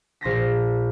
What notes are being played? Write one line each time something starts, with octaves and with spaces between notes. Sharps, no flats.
A#1 C6 A#6 B6